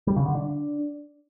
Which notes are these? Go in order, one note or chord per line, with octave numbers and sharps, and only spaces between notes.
G3
C#3
D3
D4